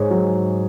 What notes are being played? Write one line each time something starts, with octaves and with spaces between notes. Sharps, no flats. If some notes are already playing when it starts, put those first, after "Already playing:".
Already playing: G#2 D#4 G#4 C#5
F#3